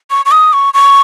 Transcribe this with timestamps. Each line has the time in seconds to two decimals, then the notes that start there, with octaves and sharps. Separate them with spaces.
0.11 C#6
0.26 C#6
0.31 D#6
0.53 C#6
0.74 C#6